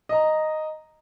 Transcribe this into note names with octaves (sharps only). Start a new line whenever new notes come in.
D#5 A#5